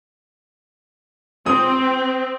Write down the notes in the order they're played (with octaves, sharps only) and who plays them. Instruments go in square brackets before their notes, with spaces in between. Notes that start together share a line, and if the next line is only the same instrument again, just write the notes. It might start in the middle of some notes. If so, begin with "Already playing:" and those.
[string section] C4 [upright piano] D#6